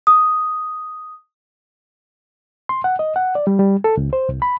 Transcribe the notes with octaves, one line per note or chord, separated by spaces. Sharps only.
D#6
C6
F#5
D#5
F#5
D5
G3
G3
A4
C#2
C5
C2
B5